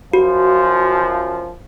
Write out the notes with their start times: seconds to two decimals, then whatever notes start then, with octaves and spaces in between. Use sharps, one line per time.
0.13 F#2 F3 F#4